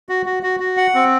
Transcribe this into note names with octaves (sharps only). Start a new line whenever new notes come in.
F#4
F#4
F#4
F#4
F#5
C4